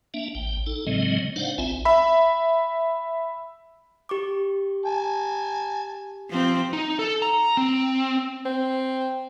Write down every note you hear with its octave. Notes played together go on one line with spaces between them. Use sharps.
A#3 D4 E5
A1 G5
D#4 A4
A2 C#3 F#3 G#3 C4 D#5
D4 D#4 C5 D5 F5 F#5
A#1 C4 F4 E5 G#5
E5 B5
G4 C#6 D6
G#5 A5
F3 C4
D#4
A4
A#5
C4
C4